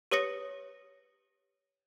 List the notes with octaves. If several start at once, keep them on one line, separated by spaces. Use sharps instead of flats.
G4 B4 C#5 D#6 A#6 C#7